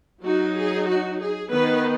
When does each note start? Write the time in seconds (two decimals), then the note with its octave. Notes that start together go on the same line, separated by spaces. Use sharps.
0.23 F#3 D#4 F#4
0.55 G#4
0.87 F#4
1.20 G#4
1.51 D#3 B3 D#4 B4